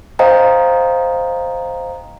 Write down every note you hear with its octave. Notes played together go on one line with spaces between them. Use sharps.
C5 D#5 F5 G5 A#5